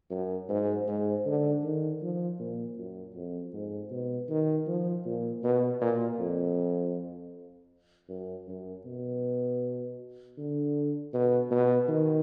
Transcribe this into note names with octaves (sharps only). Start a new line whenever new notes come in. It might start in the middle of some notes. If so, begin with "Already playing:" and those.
F#2
G#2
G#2
D3
D#3
F3
A#2
F#2
F2
G#2
B2
D#3
F3
A#2
B2
A#2
F2
F#2
F#2
B2
D3
B2
B2
D#3